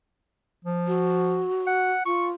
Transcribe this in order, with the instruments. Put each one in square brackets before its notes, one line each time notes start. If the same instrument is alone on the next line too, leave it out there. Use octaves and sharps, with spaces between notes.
[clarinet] F3
[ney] F#4
[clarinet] F#5
[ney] F4 [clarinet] C#6